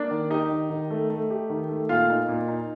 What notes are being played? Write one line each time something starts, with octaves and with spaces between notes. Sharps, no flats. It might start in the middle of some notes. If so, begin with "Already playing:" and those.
Already playing: A#3 D4 D5
D#3
D#4 G4 D#5
D#3
D#3
A3
A3
G4
D#3
A3
A#2 F4 F5
D#4
A#2
D#4